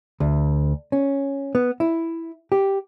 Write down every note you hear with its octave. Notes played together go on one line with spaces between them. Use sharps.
D2
C#4
B3
E4
G4